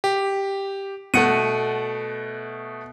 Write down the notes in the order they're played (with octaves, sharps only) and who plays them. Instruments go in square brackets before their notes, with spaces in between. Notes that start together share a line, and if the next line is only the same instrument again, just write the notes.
[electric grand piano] G4
[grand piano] B2 A3 [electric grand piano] F#5 C#7 D#7